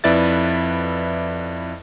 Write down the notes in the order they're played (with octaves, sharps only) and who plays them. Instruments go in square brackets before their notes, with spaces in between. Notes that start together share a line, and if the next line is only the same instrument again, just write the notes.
[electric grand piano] F2 E4 B4 D5 E5 A6